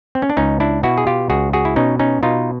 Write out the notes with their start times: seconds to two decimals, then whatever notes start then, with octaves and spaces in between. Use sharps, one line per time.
0.15 C4
0.22 C#4
0.30 D4
0.37 C#2 C#4 D#4
0.60 D4 E4
0.83 B2 E4 F#4
0.98 G#4
1.07 F4 G4
1.30 C#2 F#4 G#4
1.53 F#4 G#4
1.65 E4
1.76 B2 C#4 D#4
1.99 C#4 D#4
2.23 B2 D#4 F4